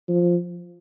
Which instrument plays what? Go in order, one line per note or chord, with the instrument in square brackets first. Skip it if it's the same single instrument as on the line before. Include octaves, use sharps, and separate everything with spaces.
[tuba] F3